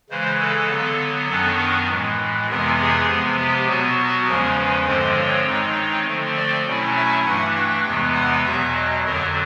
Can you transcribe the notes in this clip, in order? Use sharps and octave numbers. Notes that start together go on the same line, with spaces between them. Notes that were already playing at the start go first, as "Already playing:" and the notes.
C#3 E3 G#3 C5
A4
D3 F#3 B3
F#2 D#3 F#3 B3 D4 A4
A#4
A2 E3 G#3
F2 C3 E3 G#3 B3 A#4
G#4
C3 F3 G#3 B3
G4
B2 F#3 B3 F#4
F#4
E2 C#3 F3 G#3 C#4 A#4
B4
G2 D3 F3 G#3 C4 C5
C#5
D#3 G#3 C4 D#4
D3 F3 A3 C4
D5
B2 F#3 A3 C#4 E4
E5
G2 E3 A3 D4 F#5
G5
E2 C3 E3 G#3 B3
F#5
E2 B2 F#3 E5
D#5
F2 D3 F#3 A#4